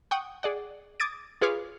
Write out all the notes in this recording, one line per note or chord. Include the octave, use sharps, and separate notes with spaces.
F#5 G5 C#6 D#6
G#4 D5 F#5
D6 D#6 G#6 A6 D7
F4 G#4 B4 C#5 F5 D6